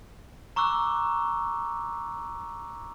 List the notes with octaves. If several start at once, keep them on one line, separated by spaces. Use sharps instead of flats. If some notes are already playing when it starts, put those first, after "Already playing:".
A#5 C#6 D6 E6 F#6